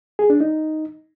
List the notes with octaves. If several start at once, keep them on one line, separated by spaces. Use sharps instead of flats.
G#4
D4
D#4